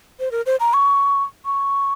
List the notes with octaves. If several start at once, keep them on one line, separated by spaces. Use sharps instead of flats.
C5
A#4
C5
A#5
C#6
C#6